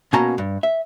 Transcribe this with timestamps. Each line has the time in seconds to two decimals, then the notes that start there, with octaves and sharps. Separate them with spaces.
0.13 B2 A#3 C#4 A5 A#5
0.38 G2
0.63 E5